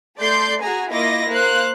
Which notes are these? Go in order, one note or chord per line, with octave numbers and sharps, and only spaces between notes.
A3 D5 C6 G6
F#4 G#4 G#5 A#5
A#3 E4 F4 D#5 D6 A#6
A#3 C5 F5 F#6